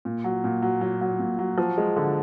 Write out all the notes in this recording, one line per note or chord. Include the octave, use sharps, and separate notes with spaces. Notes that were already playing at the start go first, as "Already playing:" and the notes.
A#2
F#3
A#2
F#3
F#3
F#3
A#2
F#3
F3
G#3
D3